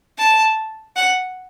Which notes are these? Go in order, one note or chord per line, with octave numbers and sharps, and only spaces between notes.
A5
F#5